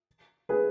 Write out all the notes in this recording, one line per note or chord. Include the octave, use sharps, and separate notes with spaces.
G#4 B4